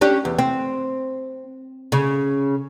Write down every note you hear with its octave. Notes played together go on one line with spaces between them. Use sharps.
C#4 D4 G4
E2
C4
C#3